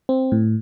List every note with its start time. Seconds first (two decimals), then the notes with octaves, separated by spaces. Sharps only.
0.09 C4
0.32 A2